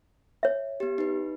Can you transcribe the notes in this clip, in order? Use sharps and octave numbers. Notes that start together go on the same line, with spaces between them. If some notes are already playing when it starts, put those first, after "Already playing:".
C#5 E5
B3 G4
D#4 B4